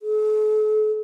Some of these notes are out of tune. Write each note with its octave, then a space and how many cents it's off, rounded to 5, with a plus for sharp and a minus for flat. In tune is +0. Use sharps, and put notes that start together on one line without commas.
A4 -45